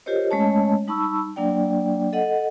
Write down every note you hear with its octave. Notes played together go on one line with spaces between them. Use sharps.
F4 G4 A#4 C5 C#5 D#5
G#3 A3 C#4 C#5 D#5 A5
G3 D#4 A5 B5 C#6 E6
F#3 A#3 D4 D5 G5
A4 D#5 F#5